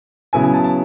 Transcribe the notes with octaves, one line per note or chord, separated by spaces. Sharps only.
C#3 F#3 B3 E4 G#5
G#5
A5
A5